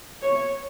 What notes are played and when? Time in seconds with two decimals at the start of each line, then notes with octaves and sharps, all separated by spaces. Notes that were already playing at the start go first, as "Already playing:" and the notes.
0.22 C#5